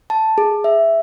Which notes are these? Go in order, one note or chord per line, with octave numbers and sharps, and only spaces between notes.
A5
G#4
E5